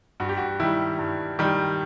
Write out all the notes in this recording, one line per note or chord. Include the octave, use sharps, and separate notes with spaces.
G2 F#4
G4
F#4
D#3 G3 E4
G2
D#3 G3